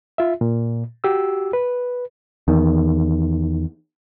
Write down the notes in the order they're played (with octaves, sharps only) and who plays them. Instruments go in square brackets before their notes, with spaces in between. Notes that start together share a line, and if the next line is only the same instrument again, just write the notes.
[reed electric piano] F4 E5
A#2
F#4 G4 E6
B4
[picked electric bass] E2 D#3